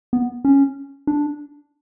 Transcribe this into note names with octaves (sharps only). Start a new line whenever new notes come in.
B3
C#4
D4